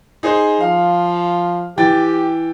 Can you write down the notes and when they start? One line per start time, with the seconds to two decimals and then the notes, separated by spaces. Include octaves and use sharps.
0.23 D#4 G#4 C5
0.61 F3 F5
1.78 E3 G4 G5 A6